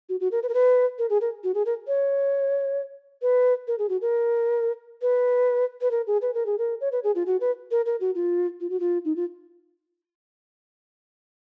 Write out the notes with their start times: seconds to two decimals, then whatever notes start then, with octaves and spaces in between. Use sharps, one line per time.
0.09 F#4
0.20 F#4
0.32 A#4
0.43 B4
0.49 A#4
0.54 B4
0.98 A#4
1.10 G#4
1.21 A#4
1.44 F#4
1.55 G#4
1.66 A#4
1.88 C#5
3.22 B4
3.68 A#4
3.79 G#4
3.89 F#4
4.01 A#4
5.02 B4
5.81 B4
5.91 A#4
6.07 G#4
6.22 B4
6.34 A#4
6.46 G#4
6.58 A#4
6.81 C#5
6.92 B4
7.04 G#4
7.15 F4
7.26 F#4
7.41 B4
7.71 A#4
7.86 A#4
8.00 F#4
8.15 F4
8.61 F4
8.70 F#4
8.80 F4
9.05 D#4
9.16 F4